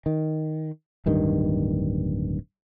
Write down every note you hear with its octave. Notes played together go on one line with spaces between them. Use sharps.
D#3
D1 G2 D#3